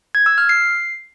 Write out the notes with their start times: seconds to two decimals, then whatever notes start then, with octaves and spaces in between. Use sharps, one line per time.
0.15 G#6
0.26 E6
0.38 F6
0.49 C7